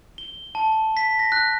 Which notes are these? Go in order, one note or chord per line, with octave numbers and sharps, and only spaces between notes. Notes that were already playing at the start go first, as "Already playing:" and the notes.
G7
A5
B6
A#6
F#6